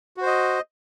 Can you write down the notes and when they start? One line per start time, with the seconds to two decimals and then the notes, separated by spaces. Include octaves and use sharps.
0.17 F#4
0.22 C5
0.26 D#5